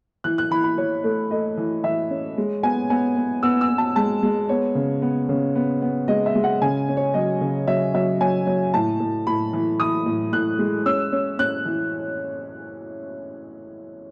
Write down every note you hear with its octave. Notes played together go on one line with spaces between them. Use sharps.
E3 F#6
F#6
E3 B5
B5
E3 C#5
A3
A3 D#5
E3
E3 E5
C#4
G#3
B3 G#5
B3 G#5
B3
B3 E6
E6
B3
A5
G#3 A5
G#3
B3 C#5
C#3
B3
C#3
B3
B3
G#3 D#5
E5
G#3
F#5
C#3 G#5
C#4
C#5
F#3 D#5
C#3
F#3 E5
F#3 E5
F#3 G#5
F#3
A2 A5
A2
A2 B5
E3
E3 D#6
A2
A2 F#6
G#3
C#4 E6
C#4
C#4 F#6
E3